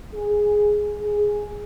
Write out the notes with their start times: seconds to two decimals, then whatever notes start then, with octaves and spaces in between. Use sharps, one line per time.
0.13 G#4
1.00 G#4